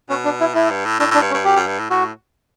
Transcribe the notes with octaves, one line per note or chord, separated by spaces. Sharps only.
B2 C#4
D4
E4
A2 E4
G2
A2
A2 D4
A2 D4
G2
C#4
G2
F#2 G4
F#2
G2
A2
A2 F#4